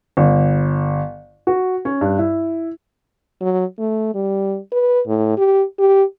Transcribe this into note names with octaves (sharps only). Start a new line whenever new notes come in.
G1
F#4
C#4
G2
E4
F#3
A3
G3
B4
A2
G4
G4